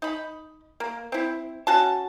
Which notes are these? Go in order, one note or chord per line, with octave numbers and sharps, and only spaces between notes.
D#4 B5
A#3
C4 E4
C#4 F#4 A5